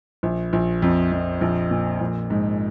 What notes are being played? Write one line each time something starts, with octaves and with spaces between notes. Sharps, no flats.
A#1
A#1
F2
F2
A#1
A#2
A#1
G#2